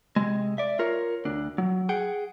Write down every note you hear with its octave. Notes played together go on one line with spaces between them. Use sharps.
C3 G#3
D5 E5
F4 A#4 C#5
D2 D4
F#3
G#4 F#5 G5